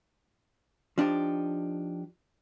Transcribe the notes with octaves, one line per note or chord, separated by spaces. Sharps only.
F3 D4 D#4 G4